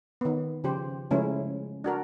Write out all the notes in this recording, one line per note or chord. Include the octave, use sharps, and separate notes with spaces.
D#3 B3
C#3 F3 G4 C5
C#3 F3 G#3 A3 C#4 E4
D4 F#4 A#4